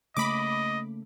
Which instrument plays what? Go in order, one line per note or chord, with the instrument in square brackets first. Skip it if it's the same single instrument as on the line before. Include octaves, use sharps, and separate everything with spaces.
[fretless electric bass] C#3 A3 A#3 [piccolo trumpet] D#5 [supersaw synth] B5 D6